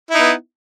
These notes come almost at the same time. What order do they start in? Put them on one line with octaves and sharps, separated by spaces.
E4 D#4 B3